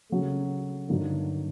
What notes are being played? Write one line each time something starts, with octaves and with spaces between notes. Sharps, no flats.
C#3 F#3 A3
G2 D3 F#3 A#3 D#4